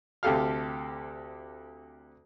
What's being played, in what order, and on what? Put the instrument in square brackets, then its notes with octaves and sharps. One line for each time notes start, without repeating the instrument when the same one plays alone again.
[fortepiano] D2 C3 G4 A4 F5 F6